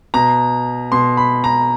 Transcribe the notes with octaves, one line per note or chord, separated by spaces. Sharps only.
B2 A#5
B2 C6
B5
A#5